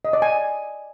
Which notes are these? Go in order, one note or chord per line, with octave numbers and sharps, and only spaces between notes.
D#5
D5
G#5